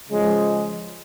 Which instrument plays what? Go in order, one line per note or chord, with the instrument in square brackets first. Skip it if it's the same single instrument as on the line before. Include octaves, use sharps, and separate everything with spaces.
[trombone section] C#3 F3 G#3